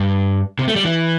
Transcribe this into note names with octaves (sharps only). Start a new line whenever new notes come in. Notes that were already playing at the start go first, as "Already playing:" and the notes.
Already playing: G2
C3
A3
G3
E3